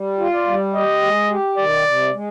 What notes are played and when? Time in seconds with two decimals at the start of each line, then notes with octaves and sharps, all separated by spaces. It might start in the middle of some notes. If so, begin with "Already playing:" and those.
Already playing: G3
0.19 F4
0.33 D5
0.47 G3
0.75 G4 D#5
1.02 G#3
1.30 G4
1.58 D#3 D5
1.85 C3
2.13 G#3